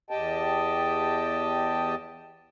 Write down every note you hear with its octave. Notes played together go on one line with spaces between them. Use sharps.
E2 G4 D#5 G5 A5